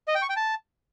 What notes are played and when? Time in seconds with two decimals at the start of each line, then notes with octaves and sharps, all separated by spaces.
0.08 D#5
0.15 G5
0.22 C#6
0.29 G5
0.36 A5